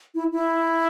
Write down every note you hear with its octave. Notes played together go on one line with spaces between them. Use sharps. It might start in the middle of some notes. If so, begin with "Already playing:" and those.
E4
E4